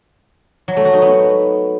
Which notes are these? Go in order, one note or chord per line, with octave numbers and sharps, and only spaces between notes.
F#3
A3
F#4
D#4
B3